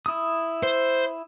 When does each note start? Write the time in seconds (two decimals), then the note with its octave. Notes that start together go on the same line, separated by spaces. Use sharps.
0.06 E4 D#6
0.63 C5